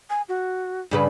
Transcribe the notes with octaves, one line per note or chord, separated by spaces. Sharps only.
G#5
F#4
G2 C#3 B4